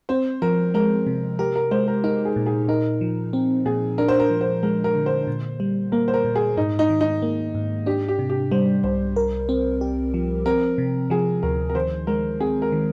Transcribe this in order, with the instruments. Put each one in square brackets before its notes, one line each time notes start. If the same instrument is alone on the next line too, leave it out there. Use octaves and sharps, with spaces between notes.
[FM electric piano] C4 [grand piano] C5
[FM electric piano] F3 [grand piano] A#4
[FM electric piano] G#3 [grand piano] A#4
[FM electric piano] C3
[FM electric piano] G4 [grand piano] A#4
[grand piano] A#4
[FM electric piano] G#3 [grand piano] C5
[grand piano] A#4
[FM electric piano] D#4 [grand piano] A#4
[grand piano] G#4
[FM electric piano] A#2
[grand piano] G#4
[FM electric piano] D#4 [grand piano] A#4
[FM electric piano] F3
C4
[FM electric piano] A#2 [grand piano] G#4
[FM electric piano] D4 [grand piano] A#4
[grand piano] C5
A#4
[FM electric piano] F3
[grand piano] C5
[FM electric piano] G#3 [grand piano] A#4
[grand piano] A#4
[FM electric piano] D3
[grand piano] C5
[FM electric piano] A#2
G3
[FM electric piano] A#3 [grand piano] A#4
[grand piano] C5
A#4
[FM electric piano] A#2
[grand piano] G#4
[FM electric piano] G#2 [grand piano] D#4
[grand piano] D#4
[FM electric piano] D#3
[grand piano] D#4
[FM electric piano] A#3
G#2
[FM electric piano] D4 [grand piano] G4
[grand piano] G4
[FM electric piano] C3
[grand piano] G4
[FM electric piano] G3 [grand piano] C5
[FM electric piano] C2 [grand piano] C5
[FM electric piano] A#4
C4
G4
F3
[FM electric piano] C4 [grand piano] A#4
[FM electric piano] C3
[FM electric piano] F3 [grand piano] G#4
[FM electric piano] D2 [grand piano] A#4
[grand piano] A#4
[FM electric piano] D#3 [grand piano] C5
[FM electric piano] G#3 [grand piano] A#4
[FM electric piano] C4 [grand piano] G#4
[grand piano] A#4
[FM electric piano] D#3